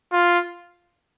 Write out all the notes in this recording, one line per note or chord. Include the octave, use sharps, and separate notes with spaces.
F4